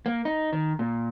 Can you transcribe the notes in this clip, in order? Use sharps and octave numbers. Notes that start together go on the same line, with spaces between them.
A#3
D#4
D#3
A#2